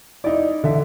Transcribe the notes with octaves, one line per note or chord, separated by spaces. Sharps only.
D#4 E4 D5
D3 E5